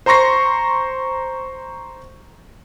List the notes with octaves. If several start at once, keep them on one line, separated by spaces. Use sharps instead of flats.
C5 A#5 C6 C#6 A#6 C7